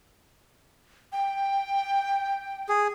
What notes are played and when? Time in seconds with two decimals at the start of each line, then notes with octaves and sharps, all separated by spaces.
1.12 G5
2.69 G#4